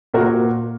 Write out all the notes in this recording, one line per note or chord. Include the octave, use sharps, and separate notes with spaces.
A#2 F#4 A#4